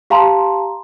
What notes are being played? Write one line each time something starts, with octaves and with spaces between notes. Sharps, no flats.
G4 F5 A5 A#5 C6